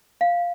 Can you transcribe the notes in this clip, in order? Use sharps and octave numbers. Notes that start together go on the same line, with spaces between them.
F5